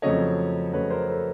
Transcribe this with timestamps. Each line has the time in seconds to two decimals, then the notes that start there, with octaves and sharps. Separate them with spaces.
0.02 F2 C#3 F#3 A3 C#5 D#5
0.73 F2 C#3 F#3 A3 B4 C#5
0.90 A#4 C5
1.08 A4 B4